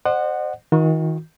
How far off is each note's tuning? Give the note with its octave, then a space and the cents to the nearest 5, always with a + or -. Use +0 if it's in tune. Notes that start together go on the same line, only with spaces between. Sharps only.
C5 +0 D#5 -45 F#5 +0
D#3 +30 F#4 -40